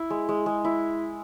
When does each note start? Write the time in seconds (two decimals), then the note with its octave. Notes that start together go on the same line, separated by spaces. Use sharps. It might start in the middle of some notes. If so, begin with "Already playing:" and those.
Already playing: E4
0.10 G#3
0.29 G#3
0.46 G#3
0.65 E4